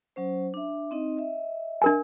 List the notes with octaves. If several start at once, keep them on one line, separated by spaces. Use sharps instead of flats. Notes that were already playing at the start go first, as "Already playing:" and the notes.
F#3 C#4 C5
D4 E5
C4 D#4 D#5
D#5 E5
D4 A#4 G#5